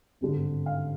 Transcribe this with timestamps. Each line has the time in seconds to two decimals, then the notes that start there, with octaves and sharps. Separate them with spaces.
0.21 G#1 G2 D3
0.66 F5